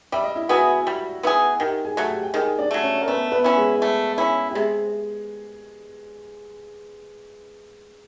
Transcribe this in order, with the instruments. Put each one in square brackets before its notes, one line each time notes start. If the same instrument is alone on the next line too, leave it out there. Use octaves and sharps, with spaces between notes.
[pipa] G3 [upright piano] E5
[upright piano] D#5
E4 E5
[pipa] B3 E4 G#4 [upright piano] F#4 F#5
[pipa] G3
B3 E4 G#4
[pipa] D#3 [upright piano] G4 G5
[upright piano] G#4 G#5
[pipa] F#3 A3 [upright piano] F#5
[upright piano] G4 G5
G5
[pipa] D#3 [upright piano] G#4 G#5
[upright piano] D4 D5
[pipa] F#3 A3
[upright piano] C#4 C#5
A#4
[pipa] A3 [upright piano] B3 B4
[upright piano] B3 B4
[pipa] C#4 E4
[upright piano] G#3 G#4
[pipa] A3
C#4 E4
[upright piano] G4
[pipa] C3 [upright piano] G#3 G#4